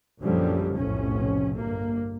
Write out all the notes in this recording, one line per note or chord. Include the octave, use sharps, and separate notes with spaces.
A#1 F#2 D3 F3 G3
F1 B1 A2 C#4
G1 A#3